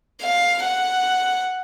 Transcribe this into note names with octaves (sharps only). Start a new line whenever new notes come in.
F5
F#5